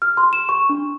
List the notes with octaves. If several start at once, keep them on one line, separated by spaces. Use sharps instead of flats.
F6
C6
E7
C#6
D4